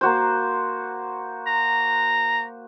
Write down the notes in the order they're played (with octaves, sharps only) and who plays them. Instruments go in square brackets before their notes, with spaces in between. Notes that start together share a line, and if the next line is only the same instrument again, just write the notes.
[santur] A#3 F#4 C5
[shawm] A#5